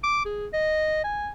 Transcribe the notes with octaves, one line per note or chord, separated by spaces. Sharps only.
D6
G#4
D#5
G#5